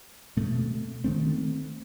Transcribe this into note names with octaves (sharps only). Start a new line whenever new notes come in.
B2 A3 C4
D#3 A3 C4